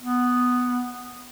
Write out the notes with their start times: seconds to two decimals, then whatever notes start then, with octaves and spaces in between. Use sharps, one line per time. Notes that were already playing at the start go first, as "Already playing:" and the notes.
0.02 B3